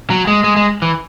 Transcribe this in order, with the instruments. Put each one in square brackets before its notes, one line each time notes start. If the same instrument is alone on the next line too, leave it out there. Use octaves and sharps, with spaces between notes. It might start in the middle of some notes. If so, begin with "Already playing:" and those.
[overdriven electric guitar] F#3
G#3
G#3
G#3
E3